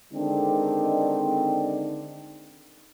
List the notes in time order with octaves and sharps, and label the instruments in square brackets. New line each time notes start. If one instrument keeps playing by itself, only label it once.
[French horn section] D3 D#3 G#3 C4 D4 D#4